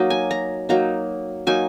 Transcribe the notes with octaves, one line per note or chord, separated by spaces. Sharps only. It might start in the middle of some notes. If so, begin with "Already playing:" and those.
Already playing: F#3 A#3 D#4 D#5
G#5
A#5
F#3 A#3 D#4 A#5
F#3 A#3 D#4 G#5